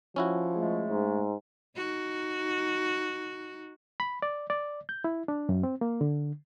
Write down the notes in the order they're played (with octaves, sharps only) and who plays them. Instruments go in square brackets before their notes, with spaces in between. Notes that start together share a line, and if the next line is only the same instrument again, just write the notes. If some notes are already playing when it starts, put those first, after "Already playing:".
[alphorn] F3 [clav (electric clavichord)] C#4 E4 F#4
[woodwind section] G#3 A3
[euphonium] G#2
[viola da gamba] D#4 F#4
[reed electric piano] B5
D5
D5
G6
E4
D4
F#2
C4
A#3
D3